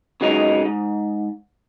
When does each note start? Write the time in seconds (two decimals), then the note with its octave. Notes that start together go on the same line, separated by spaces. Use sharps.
0.21 C#3 F#3 G#3 D#4
0.65 G#2